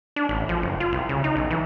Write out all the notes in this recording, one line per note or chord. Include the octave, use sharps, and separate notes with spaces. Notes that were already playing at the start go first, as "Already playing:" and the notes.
D4
A1
F3
F#1
F4
C2
C#3
D#4
B1
E3